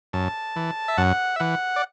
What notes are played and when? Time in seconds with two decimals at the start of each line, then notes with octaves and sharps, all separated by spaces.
0.13 F#2 A5
0.56 E3
0.88 E5
0.98 F#2 F#5
1.36 E5
1.40 E3 F#5
1.76 D5